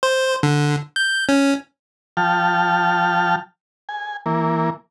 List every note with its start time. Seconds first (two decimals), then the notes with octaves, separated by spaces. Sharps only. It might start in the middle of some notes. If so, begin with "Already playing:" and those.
0.03 C5
0.43 D3
0.96 G6
1.29 C#4
2.17 F3 G5 A5 F6
3.89 G#5
4.26 E3 A#3